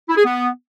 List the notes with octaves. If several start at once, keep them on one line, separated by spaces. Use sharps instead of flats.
E4
G#4
B3